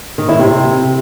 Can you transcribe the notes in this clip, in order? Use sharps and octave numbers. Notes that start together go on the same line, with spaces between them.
D#3
E4
C3